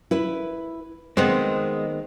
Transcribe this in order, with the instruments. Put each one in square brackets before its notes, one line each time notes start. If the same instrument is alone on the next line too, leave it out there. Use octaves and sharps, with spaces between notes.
[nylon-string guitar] E4 B4
[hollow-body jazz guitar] D#3 B3 C4 [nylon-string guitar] G#3